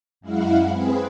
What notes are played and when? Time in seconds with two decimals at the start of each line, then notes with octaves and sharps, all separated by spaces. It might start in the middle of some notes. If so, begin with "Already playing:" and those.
0.21 F#2 G#3 E4 F5 F#5
0.66 C4 G#4 B4